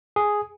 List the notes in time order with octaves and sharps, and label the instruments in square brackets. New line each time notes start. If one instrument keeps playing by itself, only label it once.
[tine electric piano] G#4